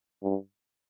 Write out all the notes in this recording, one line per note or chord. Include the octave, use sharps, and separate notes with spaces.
G2